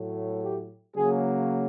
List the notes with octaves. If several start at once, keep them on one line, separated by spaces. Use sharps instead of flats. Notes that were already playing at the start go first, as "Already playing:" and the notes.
Already playing: A2 F#3 A3
G4
C#3 F#3 A#3 G#4